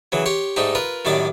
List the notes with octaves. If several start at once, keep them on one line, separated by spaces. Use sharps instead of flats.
C#3 E3 F#3
G4 C#5 C6
G#2 G3 A3 D#4 G4
F4 A#4 B4
F#2 A2 D#3 G3 D5 D6